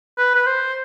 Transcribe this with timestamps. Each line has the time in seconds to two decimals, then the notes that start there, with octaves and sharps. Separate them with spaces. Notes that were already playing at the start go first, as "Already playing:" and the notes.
0.18 B4
0.35 B4
0.47 C5